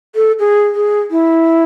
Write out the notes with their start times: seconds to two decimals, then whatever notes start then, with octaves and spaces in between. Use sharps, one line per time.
0.15 A4
0.39 G#4
0.75 G#4
1.11 E4